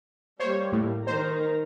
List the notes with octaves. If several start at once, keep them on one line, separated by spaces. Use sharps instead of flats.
G3 A#3 C5 C#5
A2
D#3 C5 A#5